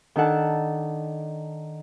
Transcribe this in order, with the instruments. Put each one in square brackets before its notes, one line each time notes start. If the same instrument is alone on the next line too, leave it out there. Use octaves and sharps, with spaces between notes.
[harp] D#3 D4 A4 F#5 A5